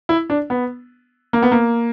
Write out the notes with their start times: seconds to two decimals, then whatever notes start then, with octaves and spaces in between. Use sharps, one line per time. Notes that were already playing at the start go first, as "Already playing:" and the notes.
0.09 E4
0.30 D4
0.50 B3
1.33 A#3
1.42 B3
1.52 A#3